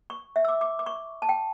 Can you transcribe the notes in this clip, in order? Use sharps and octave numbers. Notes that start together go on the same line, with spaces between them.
C#6
E5
E6
D6
D6
D6
C#6
A5
G5